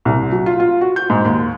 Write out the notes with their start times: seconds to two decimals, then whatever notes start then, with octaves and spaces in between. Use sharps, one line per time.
0.05 C2
0.32 F#3
0.46 F4
0.60 F4
0.81 F#4
0.96 G6
1.10 G#2
1.25 D#2